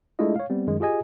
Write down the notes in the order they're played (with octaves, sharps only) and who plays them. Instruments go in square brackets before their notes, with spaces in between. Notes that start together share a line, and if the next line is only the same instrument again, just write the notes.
[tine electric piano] G#3 A3 D4 E4 F4 D#5
C#5 F5
G3 B3 C4
F#2 D#3 G#3
F4 G4 G#4 D#5 G#5